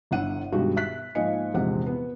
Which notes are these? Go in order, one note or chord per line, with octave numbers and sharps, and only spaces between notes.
G1 D3 E4 F#5 D#7
G2 B2 D#3 G#3 F#4 G4
E5 F#6 B6
G#2 F3 A#3 D#5 G#5 C#7
A#1 E2 C3 G#3 F#5
B3